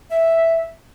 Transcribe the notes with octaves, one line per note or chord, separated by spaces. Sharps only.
E5